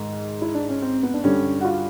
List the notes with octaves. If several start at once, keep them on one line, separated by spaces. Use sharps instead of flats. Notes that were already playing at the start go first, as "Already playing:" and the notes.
Already playing: G#2 D#3
E4
D4
C#4
C4
B3
D4
G2 D3 C#4
F#4
F4